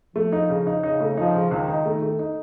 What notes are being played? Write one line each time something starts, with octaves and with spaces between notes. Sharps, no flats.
F3 A3
D#4
C#3
D#4
C#3 D#4
A3
F3 D#4
C#3
C#2 D#3
D#4
A3
A3
D#4